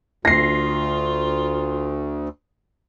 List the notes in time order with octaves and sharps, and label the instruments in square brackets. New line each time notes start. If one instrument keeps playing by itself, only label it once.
[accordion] D2 [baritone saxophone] F4 [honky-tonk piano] A#6 C7